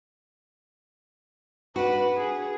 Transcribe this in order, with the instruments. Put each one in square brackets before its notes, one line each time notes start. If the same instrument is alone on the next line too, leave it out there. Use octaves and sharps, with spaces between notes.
[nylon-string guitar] D4 F#4 [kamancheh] B4
[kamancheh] G#4